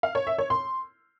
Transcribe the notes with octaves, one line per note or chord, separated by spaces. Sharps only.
F5
C#5
E5
C#5
C6